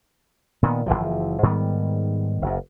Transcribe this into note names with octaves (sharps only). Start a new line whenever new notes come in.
A#2 D#3 A#3 B3
F#1 D2 E3 F3
G#2 D#3 G3 B3
F#1 F#2